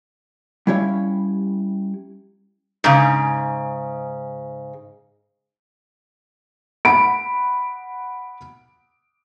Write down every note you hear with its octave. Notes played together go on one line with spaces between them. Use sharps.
G3 C#4 E4 G4 C#5 F5
G#2 C#3
F#5 B5 D7